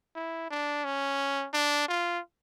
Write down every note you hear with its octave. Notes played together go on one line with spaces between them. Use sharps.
E4
D4
C#4
D4
F4